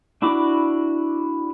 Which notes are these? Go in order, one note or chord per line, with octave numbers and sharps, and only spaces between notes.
D4 E4 F#4 B5 D6